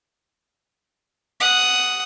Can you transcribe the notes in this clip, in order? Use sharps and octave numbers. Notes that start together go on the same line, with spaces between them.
F#5 D#6